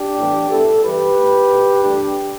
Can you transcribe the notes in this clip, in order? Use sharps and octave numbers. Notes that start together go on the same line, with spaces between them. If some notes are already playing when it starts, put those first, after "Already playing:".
Already playing: D4 G4
A2 E3 G3 B3
G2 G3 B3 E4 A4
G2 E3 G3 G4 B4
A2 A3
B2 A3
G2 E3 A3 D4 G4